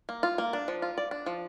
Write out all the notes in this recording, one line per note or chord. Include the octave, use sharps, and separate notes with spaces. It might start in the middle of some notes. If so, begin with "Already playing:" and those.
A#3
F4
A#3
D4
F3
F4
D5
D4
F3